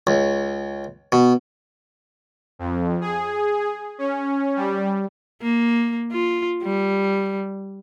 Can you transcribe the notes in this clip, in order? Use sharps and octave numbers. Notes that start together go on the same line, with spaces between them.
C#2
B2
F2
G#4
C#4
G3
A#3
F4
G3